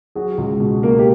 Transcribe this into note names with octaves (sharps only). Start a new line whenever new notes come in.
F#3 F#4 G#4
C#2
B2
A#3
G4